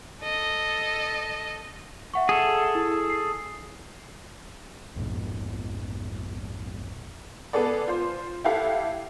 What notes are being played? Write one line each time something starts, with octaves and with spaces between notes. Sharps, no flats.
A4 D#5
E5 F#5 C#6
G#4 A4
E4 D#6
C7
A#1 F2 G#2 B2
B3 G#4 A4 D5
F4 C5
E4 G4 A4 F5 F#5